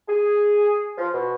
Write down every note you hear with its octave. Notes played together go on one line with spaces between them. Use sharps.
G#4
F3
B2